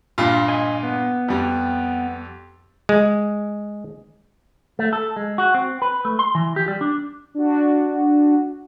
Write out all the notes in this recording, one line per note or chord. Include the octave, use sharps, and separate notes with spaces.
G2 A#2 F4
D#5 G#5
B3
F2 G3
G#3
A3
A4
G#3
F#4
C4
B4
A3
C6
E3
G4
G3
D4
D4 F#4